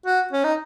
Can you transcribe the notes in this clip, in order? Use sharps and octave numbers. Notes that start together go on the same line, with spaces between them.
F#4
C#4
D#4